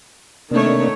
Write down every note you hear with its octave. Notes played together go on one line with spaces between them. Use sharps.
C3 D#3 A3 A#3 D4 C#5